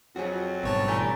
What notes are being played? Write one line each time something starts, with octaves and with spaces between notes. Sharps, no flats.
F2 F#3 F#4 G#4
G#1 G2 B2 C#5 A5
E2 A3 G4 G#5 A#5